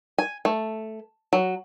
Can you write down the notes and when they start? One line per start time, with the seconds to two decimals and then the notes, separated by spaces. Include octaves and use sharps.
0.18 G#5
0.45 A3
1.33 F#3